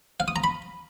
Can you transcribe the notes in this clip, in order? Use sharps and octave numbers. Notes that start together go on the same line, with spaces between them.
F5
D#6
A#5
B5